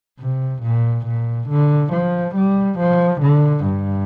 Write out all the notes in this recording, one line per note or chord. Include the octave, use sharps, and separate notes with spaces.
C3
A#2
A#2
D3
F3
G3
F3
D3
G2